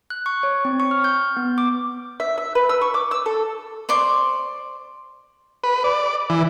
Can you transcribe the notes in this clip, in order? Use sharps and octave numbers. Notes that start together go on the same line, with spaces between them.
F#6
C#6
C#5
C4
C#6
F6
G6
B3
D6
E5
E5
B4
E6
C#6
D6
E6
A4
C5 D5 C6 C#6
B4
D5
E3